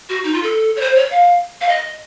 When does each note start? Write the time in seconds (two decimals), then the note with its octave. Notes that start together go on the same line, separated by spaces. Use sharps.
0.09 F#4
0.24 D#4
0.33 F4
0.43 A4
0.76 C#5
0.81 C5
0.96 C#5
1.11 F5
1.61 F5
1.68 D#5